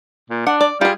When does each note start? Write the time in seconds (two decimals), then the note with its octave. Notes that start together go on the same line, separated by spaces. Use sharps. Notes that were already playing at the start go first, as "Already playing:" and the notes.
0.30 A#2
0.47 D4 F#5
0.61 D5
0.81 G3 F4 G#4